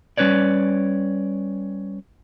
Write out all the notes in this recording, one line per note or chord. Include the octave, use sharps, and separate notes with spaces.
G3 C#4 B4 C#5 D5